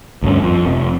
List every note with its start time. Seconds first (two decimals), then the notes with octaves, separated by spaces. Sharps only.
0.23 D2 G2 C#4
0.42 F2
0.66 F1